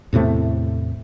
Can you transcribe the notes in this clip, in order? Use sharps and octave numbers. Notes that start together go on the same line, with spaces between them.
E2 A2 C3 A3